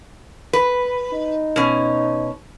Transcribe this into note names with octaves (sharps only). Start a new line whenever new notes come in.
B4
D#4
B2 C#4